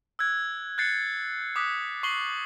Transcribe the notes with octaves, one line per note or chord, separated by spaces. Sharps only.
E6 F#6 G#6
F#6 G6 A6 C7 C#7
D6 D#6 F#6 B6
C#6 C7 F#7 G7